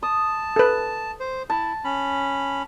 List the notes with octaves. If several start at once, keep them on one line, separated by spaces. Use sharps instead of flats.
A5 D#6
A4 B4
C5
E4 A5
C#4 B5